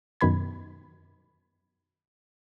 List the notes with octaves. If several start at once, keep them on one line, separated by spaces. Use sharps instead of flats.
F#2 B2 D#3 B5 G#6